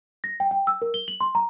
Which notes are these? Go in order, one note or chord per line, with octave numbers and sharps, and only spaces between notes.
A#6
G5
G5
E6
A#4
G7
F#7
C6
A#5